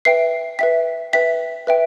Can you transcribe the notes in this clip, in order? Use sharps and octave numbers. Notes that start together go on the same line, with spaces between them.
B4 E5 G5 C7
B4 E5 G5 B6
B4 E5 G5 B6
B4 E5 G5